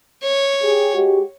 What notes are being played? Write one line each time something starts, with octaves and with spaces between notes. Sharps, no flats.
C#5
G4 G#4
G#3 F#4 G4